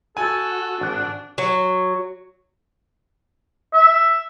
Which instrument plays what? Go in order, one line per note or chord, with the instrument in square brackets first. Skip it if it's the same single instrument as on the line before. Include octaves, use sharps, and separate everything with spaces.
[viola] F#4 [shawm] A4 [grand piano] G#5
[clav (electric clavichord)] G#1 F#5 [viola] D4
[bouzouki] F#3
[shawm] E5